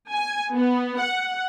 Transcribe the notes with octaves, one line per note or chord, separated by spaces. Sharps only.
G#5
B3
F#5